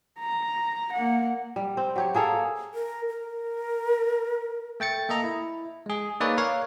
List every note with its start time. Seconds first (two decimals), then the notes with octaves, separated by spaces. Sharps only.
0.20 A#5
0.93 A#3 F#5
1.56 G3
1.77 C4
1.96 F#3 G4 C#5
2.14 A#3 G#4 A4 F5
2.74 A#4
3.08 A#4
4.80 A3 G5 A6 C#7
5.09 A#3 A4 D#5 A#5
5.24 E4
5.86 G#3 G#4
6.20 A#3 D#4 G#4 B4 C#5 D5
6.37 A#4 C#5 F5